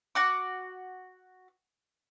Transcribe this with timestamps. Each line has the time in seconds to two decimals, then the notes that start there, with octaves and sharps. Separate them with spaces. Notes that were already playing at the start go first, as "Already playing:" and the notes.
0.15 F#4 F#5 D6